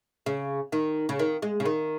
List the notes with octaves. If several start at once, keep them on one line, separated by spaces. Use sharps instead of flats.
C#3
D#3
C#3
D#3
G#3
C#3
D#3